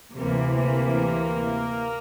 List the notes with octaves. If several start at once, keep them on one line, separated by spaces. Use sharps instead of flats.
D2 C3 E3 A#3
A#3